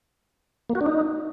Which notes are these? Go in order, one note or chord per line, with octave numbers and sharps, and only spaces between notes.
A#3
F#4
D4
D#4